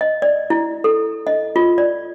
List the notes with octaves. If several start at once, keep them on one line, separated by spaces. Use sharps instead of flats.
D#5
D5
E4
A4
D#5
F4
D5